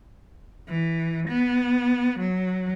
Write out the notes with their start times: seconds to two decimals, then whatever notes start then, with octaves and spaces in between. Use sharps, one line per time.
0.68 E3
1.28 B3
2.20 F#3